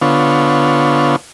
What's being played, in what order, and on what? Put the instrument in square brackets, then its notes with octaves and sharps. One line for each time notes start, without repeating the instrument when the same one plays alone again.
[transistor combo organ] D3 B3 F4 C#5